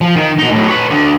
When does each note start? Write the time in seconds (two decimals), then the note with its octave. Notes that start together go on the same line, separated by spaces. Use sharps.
0.01 F3
0.16 D#3
0.39 B2 D#4
0.51 A2 F#3
0.68 B4 C#5
0.90 D2 D3